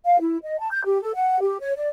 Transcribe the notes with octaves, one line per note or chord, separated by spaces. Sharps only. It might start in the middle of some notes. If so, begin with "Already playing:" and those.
F5
E4
D#5
A5
G6
G4
A4
F#5
G4
C#5
D5